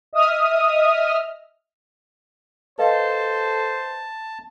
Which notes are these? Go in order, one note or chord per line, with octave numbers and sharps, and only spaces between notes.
D#5 E5 D#6 F6
A4 B4 C5 D#5 F5 A5